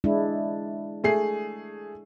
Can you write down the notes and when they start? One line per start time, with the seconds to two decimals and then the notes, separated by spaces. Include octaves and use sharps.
0.04 G#3 D4 E4
1.04 A3 G#4 C7